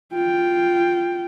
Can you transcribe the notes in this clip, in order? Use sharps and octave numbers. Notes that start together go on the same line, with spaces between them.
F4 G5